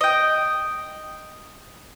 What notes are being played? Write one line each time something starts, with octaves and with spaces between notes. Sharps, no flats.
D#5 G5